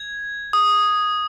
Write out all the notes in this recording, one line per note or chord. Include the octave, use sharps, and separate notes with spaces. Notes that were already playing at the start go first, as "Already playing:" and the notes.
Already playing: G#6
D#6